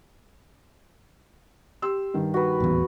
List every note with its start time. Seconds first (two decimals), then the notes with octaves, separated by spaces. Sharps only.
1.82 G4 C6 E6
2.14 G2 D#3
2.34 F#4 B4
2.60 D#1 A1 E2